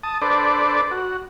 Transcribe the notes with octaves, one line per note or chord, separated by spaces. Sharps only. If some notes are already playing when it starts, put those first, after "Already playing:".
A5 D#6
D4 A4 B4 C5 D5
F#4